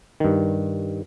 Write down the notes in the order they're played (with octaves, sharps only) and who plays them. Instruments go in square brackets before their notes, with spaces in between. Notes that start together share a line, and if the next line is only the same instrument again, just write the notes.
[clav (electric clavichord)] G2 D#3